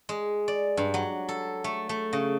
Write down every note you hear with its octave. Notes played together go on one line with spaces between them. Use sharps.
G#3
D5
G2
F#3
A4
A3
A3
C#3